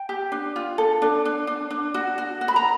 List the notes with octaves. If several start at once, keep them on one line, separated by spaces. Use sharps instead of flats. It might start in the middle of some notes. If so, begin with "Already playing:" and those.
Already playing: G5
G4
D4
F4
A4
D4
D4
D4
D4
F#4
F#4
F#4
B5
A#5